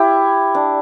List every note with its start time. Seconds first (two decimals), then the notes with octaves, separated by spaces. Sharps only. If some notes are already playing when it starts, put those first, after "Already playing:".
Already playing: E4 G4
0.54 D4